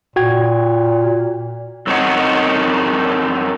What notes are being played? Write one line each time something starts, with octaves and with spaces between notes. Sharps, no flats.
A#2 F#4 G5 G#6
F#2 C4 D#4 C#5 F#5